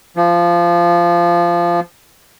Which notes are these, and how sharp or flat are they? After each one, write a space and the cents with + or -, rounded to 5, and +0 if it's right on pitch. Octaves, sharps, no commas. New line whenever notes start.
F3 -15